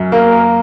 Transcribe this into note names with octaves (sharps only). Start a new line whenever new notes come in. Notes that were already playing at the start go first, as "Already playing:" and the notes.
Already playing: F#2
A#3